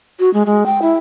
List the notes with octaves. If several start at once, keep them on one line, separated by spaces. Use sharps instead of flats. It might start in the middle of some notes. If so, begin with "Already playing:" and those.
F#4
G#3
G#3
G5
E4